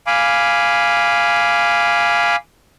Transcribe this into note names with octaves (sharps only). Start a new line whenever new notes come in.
F5 G#5 B5 D6